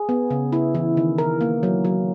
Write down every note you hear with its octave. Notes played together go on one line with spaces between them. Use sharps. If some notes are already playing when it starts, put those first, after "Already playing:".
Already playing: G#4
B3
C#3
E4
E3
D#3
A#4
A#3
F#3
F#3